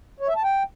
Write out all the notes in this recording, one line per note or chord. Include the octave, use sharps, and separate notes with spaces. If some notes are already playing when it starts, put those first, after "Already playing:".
C#5
E5
A5
G5